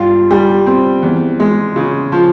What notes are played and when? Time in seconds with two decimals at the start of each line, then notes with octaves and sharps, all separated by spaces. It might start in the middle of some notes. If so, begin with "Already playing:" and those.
Already playing: G2 F4
0.31 G3
0.67 C4
1.03 E2
1.40 G#3
1.76 C#3
2.12 F3